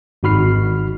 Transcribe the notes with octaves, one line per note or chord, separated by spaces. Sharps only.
G#1 D#4 F#4 B5 F6 C7